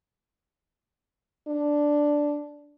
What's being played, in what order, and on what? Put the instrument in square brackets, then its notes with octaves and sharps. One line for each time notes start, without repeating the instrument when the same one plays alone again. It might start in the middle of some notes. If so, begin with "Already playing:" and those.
[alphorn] D4